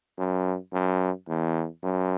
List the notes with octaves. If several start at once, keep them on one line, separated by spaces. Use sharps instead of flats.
F#2
F#2
E2
F#2